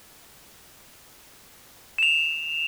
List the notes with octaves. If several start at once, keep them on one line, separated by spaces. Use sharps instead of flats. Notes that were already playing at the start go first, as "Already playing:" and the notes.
E7 F7